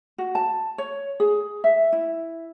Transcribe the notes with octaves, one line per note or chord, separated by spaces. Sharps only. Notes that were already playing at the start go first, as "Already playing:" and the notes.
F#4
A5
C#5
G#4
E5
E4